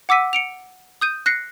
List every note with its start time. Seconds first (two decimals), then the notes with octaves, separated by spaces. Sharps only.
0.09 F#5 D6 E6 B6 D#7
0.33 C#7 D7 F7
1.01 D#6 G6 D#7
1.26 F#6 A#6 C7 C#7